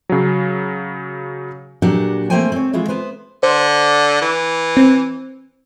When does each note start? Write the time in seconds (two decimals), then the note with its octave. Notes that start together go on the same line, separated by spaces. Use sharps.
0.09 C#3 F#3
1.82 A#2 F#3 D4 G4 F#5
2.30 A3 A#3 C4 C5 G5 G#5
2.52 C4 C#5
2.73 E3 G#3 E4 F4
2.88 B3 B4 C5
3.43 D3 C5
4.22 E3
4.77 C4